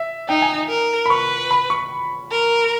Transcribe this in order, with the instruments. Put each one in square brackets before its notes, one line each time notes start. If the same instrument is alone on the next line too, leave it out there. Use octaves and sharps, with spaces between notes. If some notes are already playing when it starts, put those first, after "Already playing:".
Already playing: [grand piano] E5
[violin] D#4 [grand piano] G5
[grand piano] G#5
[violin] A#4
[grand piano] B5
[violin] B4 [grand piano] C#6
[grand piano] B5
C#6
[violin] A#4